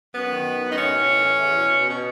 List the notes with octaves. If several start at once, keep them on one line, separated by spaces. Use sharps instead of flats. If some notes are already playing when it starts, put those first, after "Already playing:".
F#2 B3
D#3
F#2
F#2
D#4
A2 C#4
A2
E3
E3
E2
B2
B2
B2